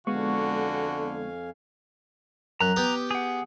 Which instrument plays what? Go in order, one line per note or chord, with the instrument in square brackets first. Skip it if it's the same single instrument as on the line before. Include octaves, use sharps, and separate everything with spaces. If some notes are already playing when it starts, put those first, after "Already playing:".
[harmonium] F2 F5 G#5 [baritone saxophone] D3 [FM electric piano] G#3 B3 C#6 [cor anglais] F#4
[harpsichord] F#2 [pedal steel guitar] A#5 F#6
[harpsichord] B3 G4 D#6
[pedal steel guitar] G#4 F#5